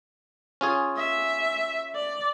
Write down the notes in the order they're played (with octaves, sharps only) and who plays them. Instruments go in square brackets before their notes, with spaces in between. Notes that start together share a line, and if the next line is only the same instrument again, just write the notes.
[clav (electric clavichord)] C#4 F4 G#4
[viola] E5
D5